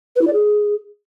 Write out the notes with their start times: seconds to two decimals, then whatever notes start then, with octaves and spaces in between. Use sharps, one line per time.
0.16 B4
0.21 E4
0.27 D5
0.33 G#4